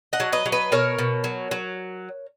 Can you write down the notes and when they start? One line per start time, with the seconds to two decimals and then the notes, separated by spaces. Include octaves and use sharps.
0.13 D#5 F#5
0.20 F#3
0.32 B4 D#5
0.46 F#3
0.52 B4 D#5
0.72 B2 A#4 C#5
0.99 B2
1.24 F#3
1.51 F#3